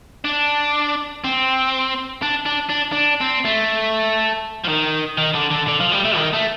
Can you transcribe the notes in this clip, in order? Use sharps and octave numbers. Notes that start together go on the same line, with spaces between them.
D4
C4
D4
D4
D4
D4
C4
A3
F3
D#3
D#3
D3
D3
D3
F3
G3
A3
D#3
A3